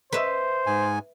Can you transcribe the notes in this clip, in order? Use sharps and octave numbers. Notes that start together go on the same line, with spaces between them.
B4 C5 E5
G#2 G#5